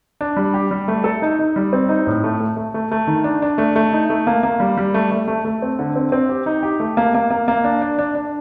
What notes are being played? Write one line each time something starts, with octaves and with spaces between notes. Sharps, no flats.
D4
G3
G4
G3
A3
A4
D#4
D#4
G3
C4
D#4
A2
A3
A3
A3
A3
A3
D#3
D4
D4
A3
A3
D#4
A3
A#3
A#3
G3
G3
A3
A3
A3
A3
C4
D3
C4
C4
G4
D#4
G4
A3
A#3
A#3
A#3
A#3
D4
D4
D4
D4